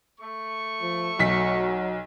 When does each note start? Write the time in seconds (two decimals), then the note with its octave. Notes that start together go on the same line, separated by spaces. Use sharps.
0.20 A3 C#6
0.82 F3
1.19 B1 F#3 B6